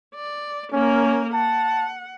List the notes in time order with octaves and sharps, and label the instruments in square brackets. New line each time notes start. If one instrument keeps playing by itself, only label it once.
[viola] D5
[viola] A#3 A#4 [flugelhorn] C#4
[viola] F#5 [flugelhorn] A5